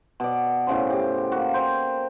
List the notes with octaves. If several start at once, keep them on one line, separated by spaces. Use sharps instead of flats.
B2 D5
A2 C#3 C5
G4
A#3 F#4
C5 G5